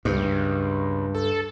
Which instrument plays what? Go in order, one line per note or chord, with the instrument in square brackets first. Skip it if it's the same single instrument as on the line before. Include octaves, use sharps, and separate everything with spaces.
[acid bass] C#2 [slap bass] G2
[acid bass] A4